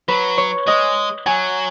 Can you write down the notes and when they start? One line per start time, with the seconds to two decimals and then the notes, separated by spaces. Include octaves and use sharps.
0.08 F#3 B4
0.38 C#5
0.67 G#3 D#5
1.26 F#3 G#5